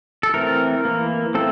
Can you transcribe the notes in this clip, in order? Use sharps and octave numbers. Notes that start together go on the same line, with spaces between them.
A4
E3 A3 C4 A#4
E3 A#3
A3 C4 A4